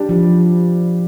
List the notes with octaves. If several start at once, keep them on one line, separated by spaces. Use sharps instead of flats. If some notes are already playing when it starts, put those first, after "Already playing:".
Already playing: G3 D4 G4
F3